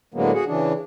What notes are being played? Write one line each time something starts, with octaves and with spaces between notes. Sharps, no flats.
A2 D3 F#3 G#3 A#3 B3
F#4 G#4 F#5
C#3 E3 D4